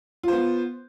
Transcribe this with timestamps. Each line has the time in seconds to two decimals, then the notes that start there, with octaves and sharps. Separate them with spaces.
0.23 F4
0.28 C5
0.33 B3